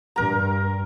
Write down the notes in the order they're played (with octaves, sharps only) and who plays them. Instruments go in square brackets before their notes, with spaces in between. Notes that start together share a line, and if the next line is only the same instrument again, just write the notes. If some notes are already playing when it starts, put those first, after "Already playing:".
[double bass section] G2 [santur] A#4 A#5